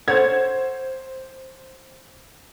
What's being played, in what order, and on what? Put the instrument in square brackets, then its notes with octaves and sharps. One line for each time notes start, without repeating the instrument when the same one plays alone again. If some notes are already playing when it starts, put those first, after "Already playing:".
[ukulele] A4 C#5 F#5 [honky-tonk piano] C5 G#6